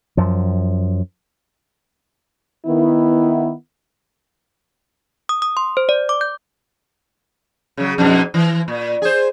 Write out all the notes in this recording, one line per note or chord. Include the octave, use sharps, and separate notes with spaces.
F#2 F3
D#3 B3 E4
D#6
D#6
C6
C5
D5
D6
G6
C#3 F#3
F2 G#2 B2
E3
A#2
G#4 C5